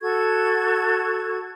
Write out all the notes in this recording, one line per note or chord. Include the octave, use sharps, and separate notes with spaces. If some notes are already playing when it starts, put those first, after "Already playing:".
F#4 A4 C#6 G#6